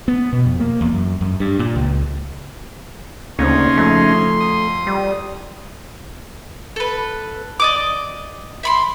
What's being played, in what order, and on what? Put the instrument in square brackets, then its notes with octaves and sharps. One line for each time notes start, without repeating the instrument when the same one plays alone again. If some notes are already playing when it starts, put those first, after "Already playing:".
[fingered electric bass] B3
B2
F2
A#3
E2
F#2
F#2
G2
A#2
C#2
[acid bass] D2 [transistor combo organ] C#3 C#4 D#4 [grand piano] A#3 C4 [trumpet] C6
[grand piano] F2 [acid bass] A3
[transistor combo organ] D#6
[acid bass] G3
[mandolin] A4 B4
D5 D#5 D6
E5 B5 C6